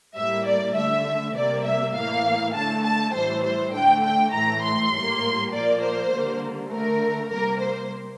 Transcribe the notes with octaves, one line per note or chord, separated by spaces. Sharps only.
A2 G3 A#3 E5
D5
D3 A3 E5
C3 G3 A#3 D5
E5
A2 E3 A#3 F5
D3 A3 A5
A5
A2 E3 G3 C5
C5
D3 A3 G5
G5
A2 E3 A3 A#5
C6
A2 G3 A#3
A#2 F3 A#3 D5
C5
D3 G3 A#3
D3 A3 A#4
C3 G3 A#3 A#4
C5